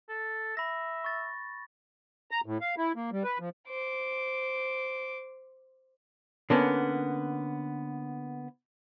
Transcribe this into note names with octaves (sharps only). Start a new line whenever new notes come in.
A4
E5 B5 A#6
C#6 A6
A#5
A2
F5
E4
A#3
G3
B4
F3
C5 D6
D3 A#3 B3 C#4